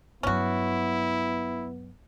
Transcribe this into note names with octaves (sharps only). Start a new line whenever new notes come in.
G2 F#3 B3 C#4 E4 F#4